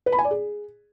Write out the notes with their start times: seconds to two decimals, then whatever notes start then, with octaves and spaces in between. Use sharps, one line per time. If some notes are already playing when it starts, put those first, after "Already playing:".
0.06 B4
0.12 B5
0.19 G#5
0.25 D5
0.31 G#4